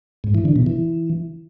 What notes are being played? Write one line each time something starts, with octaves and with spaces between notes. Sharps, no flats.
G#2
E3
D3
B2
E3